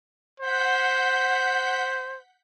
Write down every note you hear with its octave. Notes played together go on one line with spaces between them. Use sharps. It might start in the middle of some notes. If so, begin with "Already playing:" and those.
C5 F#5 G6 B6